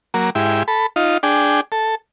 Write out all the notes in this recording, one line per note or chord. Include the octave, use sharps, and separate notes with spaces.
F#3 A#3
G#2 E4 G4
A4 B5
D#4 F4
D4 G#4 G5
A4